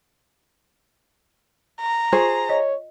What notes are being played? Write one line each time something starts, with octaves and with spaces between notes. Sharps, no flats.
A#5
F4 G#4 C5 C#6
C#5 D#5